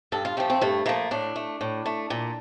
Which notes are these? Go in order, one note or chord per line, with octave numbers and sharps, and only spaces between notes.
G2 A4
F4
F3 A3 G4
C4
G2 A3
F3 A3 A#3
A2 D4
A3
A2
A3
A#2